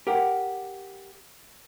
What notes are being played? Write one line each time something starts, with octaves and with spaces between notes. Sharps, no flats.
G4 A#4 F#5